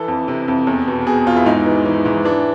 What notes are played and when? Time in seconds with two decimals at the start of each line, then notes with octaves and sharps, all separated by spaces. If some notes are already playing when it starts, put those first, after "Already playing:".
Already playing: E3 A4
0.08 F2
0.28 C3
0.48 F2
0.67 E2
0.88 B2
1.07 B2 G#4
1.26 E2 F4
1.37 E4
1.46 G#2 D#4
1.66 E3
1.86 E3
2.05 G#2
2.25 E3 D4